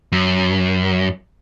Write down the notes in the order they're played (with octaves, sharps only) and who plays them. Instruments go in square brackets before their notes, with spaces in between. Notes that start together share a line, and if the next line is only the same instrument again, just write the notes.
[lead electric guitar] F#2